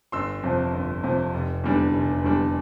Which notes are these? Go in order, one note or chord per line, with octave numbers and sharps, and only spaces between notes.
G1 C6 E6
F2 C3 F3
G1
F2 C3 F3
F1
E2 D3 G3 D4
F1
E2 D3 G3 D4